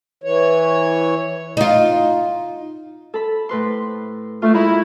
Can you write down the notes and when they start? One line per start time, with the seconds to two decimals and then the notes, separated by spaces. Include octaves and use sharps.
0.24 E3 C#5
1.57 D#4 F4
3.14 A4 B5
3.49 A2 B4 C6
4.42 A3 F4
4.54 G#3 E4 G#4 A#5